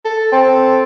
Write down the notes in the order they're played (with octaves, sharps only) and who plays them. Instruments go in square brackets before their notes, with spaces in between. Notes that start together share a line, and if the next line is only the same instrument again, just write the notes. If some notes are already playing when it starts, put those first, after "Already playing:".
[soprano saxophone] A4
[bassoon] C4 [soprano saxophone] A4